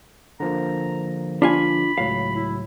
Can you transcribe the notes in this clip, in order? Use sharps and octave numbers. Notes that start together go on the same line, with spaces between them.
D3 F3 A#3 A#5
D4 F4 G#5 B5
C#2 A2 F#3 F5
E4